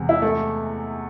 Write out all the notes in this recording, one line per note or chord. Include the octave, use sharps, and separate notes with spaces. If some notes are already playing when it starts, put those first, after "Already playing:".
Already playing: E2 C3 G#3
E4
A3